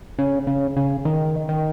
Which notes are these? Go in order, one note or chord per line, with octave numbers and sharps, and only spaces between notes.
C#3
C#3
C#3
D#3
D#3